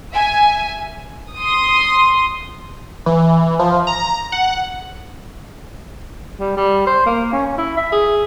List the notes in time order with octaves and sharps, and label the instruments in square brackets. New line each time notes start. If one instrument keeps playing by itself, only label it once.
[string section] E5 G#5
[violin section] C6 D#6
[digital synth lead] E3
F3
A#5
F#5
[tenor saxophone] G3
G3
C5
A#3
C#4
E4
E5
G#4